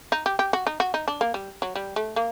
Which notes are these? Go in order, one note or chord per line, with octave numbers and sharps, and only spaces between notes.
D#4
G4
G4
F#4
D#4
F#4
D#4
D4
A#3
G3
F#3
G3
A3
A#3